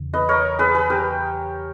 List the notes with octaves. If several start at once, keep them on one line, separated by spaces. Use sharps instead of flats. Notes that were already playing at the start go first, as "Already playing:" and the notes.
Already playing: E2 C#3 E3
B4 D#5
A#4 C#5
G#4 B4
G#4 B4
G4 A#4